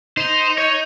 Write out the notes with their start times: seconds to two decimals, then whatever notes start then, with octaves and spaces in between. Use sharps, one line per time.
0.17 D#4 C5
0.58 C#5